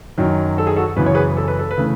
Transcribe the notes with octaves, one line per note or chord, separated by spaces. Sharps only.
F#2 D#3 F#3 C#4
A4
G#4
F#4 A4
F#2 C#3 E3 B3 B4
C#5
G#4 B4
A4
B4
A4
B4
C#3 E3 A3